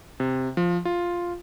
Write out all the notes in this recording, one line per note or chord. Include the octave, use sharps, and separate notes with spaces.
C3
F3
F4